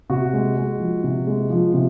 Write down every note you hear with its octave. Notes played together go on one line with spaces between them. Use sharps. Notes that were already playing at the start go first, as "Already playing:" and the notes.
C3 F#4
G#3
G#3
F3
C3
G#3
F3
C3